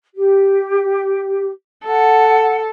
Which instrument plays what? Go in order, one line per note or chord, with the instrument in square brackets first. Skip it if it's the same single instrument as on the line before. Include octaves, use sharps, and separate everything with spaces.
[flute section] G4
[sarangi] A4 [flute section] F#5